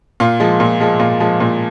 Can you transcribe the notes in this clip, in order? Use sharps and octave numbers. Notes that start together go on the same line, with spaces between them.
A#2 F4
F3 G#3
A#2
F3 G#3
A#2 F4
F3 G#3
A#2